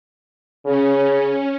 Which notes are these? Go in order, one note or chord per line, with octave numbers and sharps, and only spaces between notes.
C#3 C#4